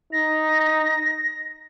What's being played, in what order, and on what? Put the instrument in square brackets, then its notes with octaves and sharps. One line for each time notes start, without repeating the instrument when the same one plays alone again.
[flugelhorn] D#4 [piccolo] A#6